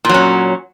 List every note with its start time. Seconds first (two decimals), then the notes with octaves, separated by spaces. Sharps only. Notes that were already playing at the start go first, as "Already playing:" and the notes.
0.05 A#2
0.09 F#3
0.14 C#4